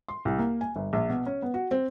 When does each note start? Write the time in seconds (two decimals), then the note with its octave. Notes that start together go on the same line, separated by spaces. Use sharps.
0.08 C6
0.25 C2
0.38 A#3
0.61 G#5
0.76 G1
0.93 A#1
1.09 B2
1.26 C#4
1.42 B3
1.54 F#4
1.71 C4